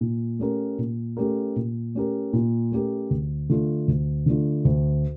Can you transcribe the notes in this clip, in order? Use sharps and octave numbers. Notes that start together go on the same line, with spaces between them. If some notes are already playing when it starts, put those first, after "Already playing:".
A#2
A3 C#4 G4 A#4
A#2
A3 C#4 G4 A#4
A#2
A3 C#4 G4 A#4
A#2
A3 C#4 G4 A#4
D2
D3 A3 D4 F4
D2
D3 A3 D4 F4
D2